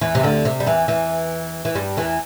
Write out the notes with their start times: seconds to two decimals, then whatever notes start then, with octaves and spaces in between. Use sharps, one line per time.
0.01 E2 E3
0.15 C3
0.23 D2 D3
0.45 C3
0.60 G3
0.66 E2 E3
0.88 E2 E3
1.65 E3
1.75 G2 G3
1.97 E2 E3